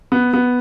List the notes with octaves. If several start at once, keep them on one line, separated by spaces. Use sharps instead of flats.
B3
B3